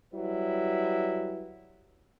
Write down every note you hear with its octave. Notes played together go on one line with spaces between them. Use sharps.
F#3 G3 E4 B4